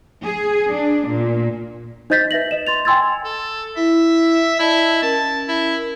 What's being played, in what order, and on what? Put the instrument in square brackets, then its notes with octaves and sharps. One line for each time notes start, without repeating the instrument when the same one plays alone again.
[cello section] G#4
D4
A#2
[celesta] D#4 C5 D#5 G6 A6 B6
B4 E5 A#6 F#7
D#5 E7
C6 A6 F7
G5 G#5 C6 E6 G#6 A6
[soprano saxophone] A4
[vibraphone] E4 [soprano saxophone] E5
[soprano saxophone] E4 [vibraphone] D5 D#5 A5
[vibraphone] C#4 A#4 [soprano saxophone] A5
[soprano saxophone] E4